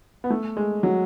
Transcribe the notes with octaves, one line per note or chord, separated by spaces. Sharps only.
B3
A3
G#3
F#3